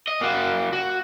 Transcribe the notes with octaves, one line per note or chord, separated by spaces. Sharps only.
D#5
A#3 F#4
F#4